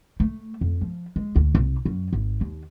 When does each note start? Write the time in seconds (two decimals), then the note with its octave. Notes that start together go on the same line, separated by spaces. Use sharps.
0.20 A3
0.61 F2
0.81 F3
1.16 G#3
1.36 D2
1.55 C2
1.85 F#2
2.13 G#1
2.41 D#2